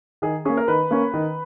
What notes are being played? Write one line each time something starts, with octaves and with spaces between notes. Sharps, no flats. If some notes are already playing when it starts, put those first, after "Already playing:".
D#3 G#4
A#3 C#4 G#4
A#4
D#3 B4
A#3 C#4
D#3